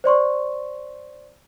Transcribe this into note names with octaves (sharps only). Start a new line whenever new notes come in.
C5 D5 C6 C#6